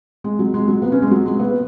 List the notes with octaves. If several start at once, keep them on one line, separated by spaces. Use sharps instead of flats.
G#3
F#3
G#3
F#3
B3
C#4
G#3
F#3
G#3
B3